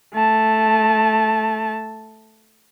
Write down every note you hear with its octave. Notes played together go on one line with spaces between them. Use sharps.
A3 A5